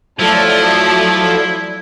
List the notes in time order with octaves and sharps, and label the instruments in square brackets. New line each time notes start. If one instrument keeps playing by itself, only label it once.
[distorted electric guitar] F3 [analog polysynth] F#3 A4 D5 [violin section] A3 [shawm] E4